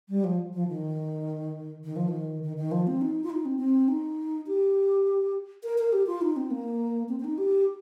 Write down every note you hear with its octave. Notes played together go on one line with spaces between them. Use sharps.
G3
F3
F3
D#3
D#3
F3
D#3
D#3
D#3
F3
C4
D#4
F4
D#4
C4
C4
D#4
G4
A#4
A#4
G4
F4
D#4
C4
A#3
C4
C4
D#4
G4